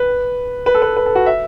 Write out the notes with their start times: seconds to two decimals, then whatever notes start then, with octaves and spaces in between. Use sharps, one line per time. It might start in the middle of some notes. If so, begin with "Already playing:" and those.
Already playing: B4
0.66 B4
0.75 A4
0.82 B4
0.97 B4
1.06 A4
1.15 F#4
1.26 E5